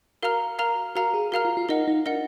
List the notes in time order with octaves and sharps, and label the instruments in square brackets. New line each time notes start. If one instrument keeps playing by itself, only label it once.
[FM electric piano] F#4 [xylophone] A#4 F5 A#5 F6
[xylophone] A#4 F5 A#5 F6
[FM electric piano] F#4 [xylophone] A#4 F5 A#5 F6
[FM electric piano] G#4
[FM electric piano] F#4 [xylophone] A#4 F5 A#5 F6
[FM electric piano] F4
F4
[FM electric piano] D#4 [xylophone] A#4 D#5 F#5
[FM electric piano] D#4
[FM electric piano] D4 [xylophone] A#4 D#5 F#5